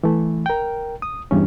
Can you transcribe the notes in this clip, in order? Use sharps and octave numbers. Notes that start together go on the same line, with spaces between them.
E3 A3
A#4 G5
D#6
E2 G2 C#4